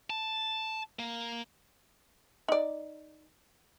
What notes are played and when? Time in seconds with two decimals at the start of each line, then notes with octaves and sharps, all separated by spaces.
0.10 A5
0.99 A#3
2.48 D#4 D5